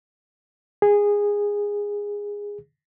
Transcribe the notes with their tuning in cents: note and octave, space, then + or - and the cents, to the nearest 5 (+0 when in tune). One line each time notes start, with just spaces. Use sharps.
G#4 -15